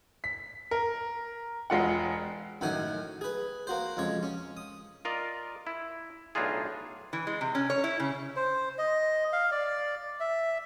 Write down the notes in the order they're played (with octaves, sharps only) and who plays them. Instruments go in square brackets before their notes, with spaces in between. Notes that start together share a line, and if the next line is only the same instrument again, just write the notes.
[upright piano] B6
A#4
E1 G#3 F4 F#5
[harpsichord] F#2 A2 D#3 C#4 F#5 G#5
G#4 B4
A#3 F#4 C5
F2 C#3 G#3 C#5
C#4
D#6
[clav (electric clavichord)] F4 A#4 D5 D#5
E4
B1 A2 D4 D#4 F4 G#4
[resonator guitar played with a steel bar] E3
G#3
C3
C#4
C#5
E4
C#3
[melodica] C5
D#5
F5
D5
E5